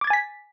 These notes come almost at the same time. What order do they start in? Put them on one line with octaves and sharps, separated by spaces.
D6 G#6 A6 G#5 B6